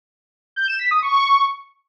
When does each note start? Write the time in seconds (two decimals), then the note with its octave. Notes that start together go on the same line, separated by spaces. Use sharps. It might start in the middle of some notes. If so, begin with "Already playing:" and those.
0.56 G6
0.68 E7
0.79 B6
0.91 D#6
1.02 C#6